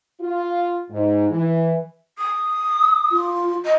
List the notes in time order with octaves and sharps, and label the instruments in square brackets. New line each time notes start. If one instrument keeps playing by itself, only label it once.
[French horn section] F4
G#2
E3
[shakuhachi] D#6
[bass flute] F4
[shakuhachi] D#5